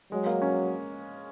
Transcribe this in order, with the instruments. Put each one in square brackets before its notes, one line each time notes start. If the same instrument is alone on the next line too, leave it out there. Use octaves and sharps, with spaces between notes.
[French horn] F#3 [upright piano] G#3
[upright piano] A#3
C#4